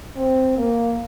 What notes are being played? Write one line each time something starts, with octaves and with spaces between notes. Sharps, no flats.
C4
A#3